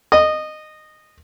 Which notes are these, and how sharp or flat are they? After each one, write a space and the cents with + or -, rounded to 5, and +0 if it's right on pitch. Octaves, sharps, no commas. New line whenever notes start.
D#5 -15